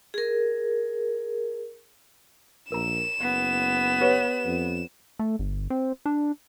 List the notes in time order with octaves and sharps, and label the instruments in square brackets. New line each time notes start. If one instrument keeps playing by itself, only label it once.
[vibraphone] G#4 A#4
[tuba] A#1 [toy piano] A#4 A#5 [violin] E7
[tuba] F#1 [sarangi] B3
[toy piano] G4 B4 C#5
[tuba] F2
[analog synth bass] A3
G1
C4
D4